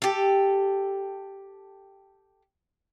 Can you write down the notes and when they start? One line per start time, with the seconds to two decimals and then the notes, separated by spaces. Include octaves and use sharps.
0.02 G4 A4